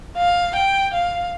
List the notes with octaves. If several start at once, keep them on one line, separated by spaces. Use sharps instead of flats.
F5
G5
F5